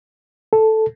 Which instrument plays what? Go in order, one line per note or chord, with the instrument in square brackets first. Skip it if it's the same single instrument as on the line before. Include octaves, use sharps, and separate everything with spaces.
[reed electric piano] A4